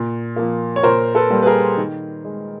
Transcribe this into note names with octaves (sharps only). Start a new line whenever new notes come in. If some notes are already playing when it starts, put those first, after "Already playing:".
Already playing: A#2
F3 A#3
C#5
A#2 A#4 C5
A4 B4
G3 A#3
B4
G#4 A#4
D#3
G#3